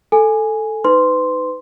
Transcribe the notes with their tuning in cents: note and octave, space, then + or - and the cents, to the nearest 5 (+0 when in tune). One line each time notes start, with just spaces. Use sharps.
A4 +0 G#5 +0
D#4 +0 B4 +35 C6 +0